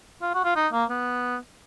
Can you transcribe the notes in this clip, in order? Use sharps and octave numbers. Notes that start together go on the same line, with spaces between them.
F4
F#4
F4
D#4
A#3
B3